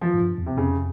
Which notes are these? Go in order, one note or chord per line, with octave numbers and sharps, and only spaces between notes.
E3 F3
G#2
G2
E2
C3
F2 C#3